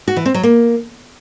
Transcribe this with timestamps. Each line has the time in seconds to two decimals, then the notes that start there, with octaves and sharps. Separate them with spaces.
0.08 F#4
0.17 E3
0.26 C4
0.34 F#3
0.43 A#3